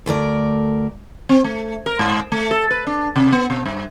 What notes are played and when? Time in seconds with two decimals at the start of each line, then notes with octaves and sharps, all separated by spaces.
0.06 D2 A3 A#4 D5
1.29 C4
1.44 A3
1.86 A#4
1.99 G#2
2.32 A3
2.51 A4
2.71 B4
2.87 D4
3.16 C3
3.32 B3
3.50 B2
3.66 G2